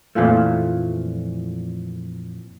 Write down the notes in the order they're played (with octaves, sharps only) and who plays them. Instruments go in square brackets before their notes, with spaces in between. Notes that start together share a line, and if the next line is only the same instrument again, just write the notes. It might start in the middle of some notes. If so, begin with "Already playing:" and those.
[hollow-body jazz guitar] F2 A#2 E3 F3 A3